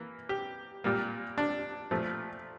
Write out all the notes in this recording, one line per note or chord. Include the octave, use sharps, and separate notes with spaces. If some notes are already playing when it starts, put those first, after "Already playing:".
Already playing: E3 A#3
G4
A#2 G3 A#3
D4
A#2 F3 A3